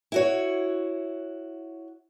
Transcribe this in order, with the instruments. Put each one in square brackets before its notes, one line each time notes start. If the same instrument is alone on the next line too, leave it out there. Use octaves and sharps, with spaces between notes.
[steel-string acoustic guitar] E4 F#4 C#5